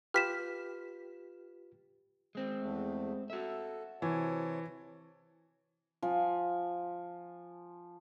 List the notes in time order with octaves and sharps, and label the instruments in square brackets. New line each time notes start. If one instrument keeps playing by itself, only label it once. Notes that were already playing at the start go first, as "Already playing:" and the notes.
[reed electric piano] F4 G4 B4 [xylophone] F6 B6 E7
[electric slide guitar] G#3 C4
[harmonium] E2 A3
[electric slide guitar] F#4 E5 [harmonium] A4
[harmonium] C3 C#5 A5 [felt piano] E3
[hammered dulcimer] F3 G#5